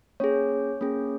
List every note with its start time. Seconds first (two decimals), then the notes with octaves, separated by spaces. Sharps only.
0.20 A#3 C#4 G#4 C#5
0.81 A#3 C#4 G#4